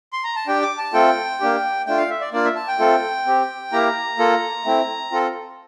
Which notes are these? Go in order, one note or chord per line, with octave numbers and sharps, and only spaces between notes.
C6
A#5
A5
D4 G4 G5
D6
A5
A3 C4 F4 A4 G5
A#3 D4 G4
A3 D4 F4 G5
F5
E5
D5
A#3 D4 F4 D5
E5
A5
G5
A3 C4 F4 A4
C4 G4
A#3 E4 G4 A#5
A#3 F4 A4
A3 C4 E4
C4 F4 A4